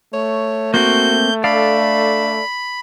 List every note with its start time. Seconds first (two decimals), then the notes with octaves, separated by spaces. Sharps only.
0.14 A3 C#5
0.74 A#3 C4 F#4 G6
1.44 D4 A4 D5 F5 B5